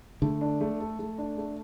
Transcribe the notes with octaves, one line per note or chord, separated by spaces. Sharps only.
D3 A3
D4
A3
A4
A3
D4
A3